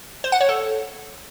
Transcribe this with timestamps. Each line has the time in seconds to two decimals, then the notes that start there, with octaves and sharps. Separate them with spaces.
0.24 C5
0.32 F#5
0.41 C#5
0.49 A4